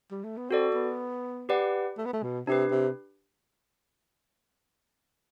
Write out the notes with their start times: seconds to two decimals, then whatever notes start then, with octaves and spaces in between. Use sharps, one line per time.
0.11 G3
0.24 A3
0.37 B3
0.50 C4 F#4 A4 D5
0.74 B3
1.49 G4 B4 D5 F#5
1.98 A3
2.05 B3
2.13 A3
2.23 B2
2.47 C3 D4 G4 B4
2.71 C3